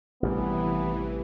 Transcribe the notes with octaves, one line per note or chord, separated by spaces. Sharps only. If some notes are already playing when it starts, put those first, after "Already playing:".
A1 C3 E3 G3 B3